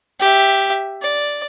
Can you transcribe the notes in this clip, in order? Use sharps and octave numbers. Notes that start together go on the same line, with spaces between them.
G4 E5
D5